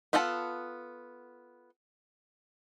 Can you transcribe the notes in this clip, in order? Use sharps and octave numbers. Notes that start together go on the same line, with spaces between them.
B3 F4 A4 F#5 A5